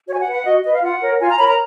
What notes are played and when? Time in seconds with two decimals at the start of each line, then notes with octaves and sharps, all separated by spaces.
0.06 F#4 C#5
0.13 G#5
0.20 F#5
0.26 B4
0.33 F#5
0.44 F#4 D#5
0.64 B4 D#5
0.73 F5
0.82 F4 F#5
1.01 A#4 C#5
1.20 F4 G#5
1.29 A#5
1.39 A#4 C#5 B5
1.48 A#5